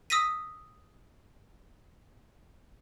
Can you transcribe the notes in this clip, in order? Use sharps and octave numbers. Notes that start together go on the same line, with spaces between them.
D#6 E6 A#6 B6 D#7